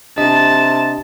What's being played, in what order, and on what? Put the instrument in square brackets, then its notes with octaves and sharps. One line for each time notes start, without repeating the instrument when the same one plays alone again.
[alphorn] C3 [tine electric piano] D4 D#5 [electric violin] A5